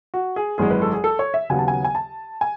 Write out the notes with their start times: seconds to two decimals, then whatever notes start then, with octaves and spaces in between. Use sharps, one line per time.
0.14 F#4
0.36 G#4
0.58 G#1 F#2 E3 G#3 G#4
0.71 B4
0.82 A4
0.93 G#4
1.04 A4
1.19 C#5
1.34 E5
1.50 D#2 C#3 F#3 B3 G#5
1.59 A5
1.68 G#5
1.85 G#5
1.95 A5
2.41 G#5